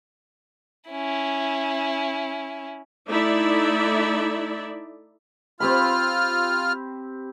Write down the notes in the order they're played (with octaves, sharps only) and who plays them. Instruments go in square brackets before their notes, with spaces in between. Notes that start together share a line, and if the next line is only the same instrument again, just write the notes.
[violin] C#4 E4
[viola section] A3 D#4 E4 D5 E5
[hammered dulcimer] C4 G4 B5 [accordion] F4 F6